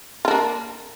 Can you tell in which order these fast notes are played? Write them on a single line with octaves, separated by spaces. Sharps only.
F4 D4 A#3